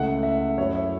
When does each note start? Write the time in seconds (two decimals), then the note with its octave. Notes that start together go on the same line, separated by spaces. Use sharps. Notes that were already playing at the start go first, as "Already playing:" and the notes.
Already playing: C#2 C#3 A3 E4 F#5
0.23 E5
0.58 F#2 F#3 A3 E4 C#5
0.75 E5